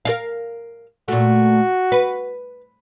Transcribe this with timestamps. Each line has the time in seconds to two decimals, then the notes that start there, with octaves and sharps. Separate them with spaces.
0.05 A#4 D5 F5
1.08 A#2 A3 F#4
1.92 B4